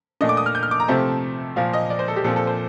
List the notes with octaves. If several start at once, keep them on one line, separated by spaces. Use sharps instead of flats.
A#2 A3 D4 D#5
D6
D#6
F6
G6
F6
D6
A#5
C3 F3 A3 C4 A5
A#2 F3 A#3 F5
D#5
D5
C5
A4
G4
A#2 F3 C4 A4
A4
C5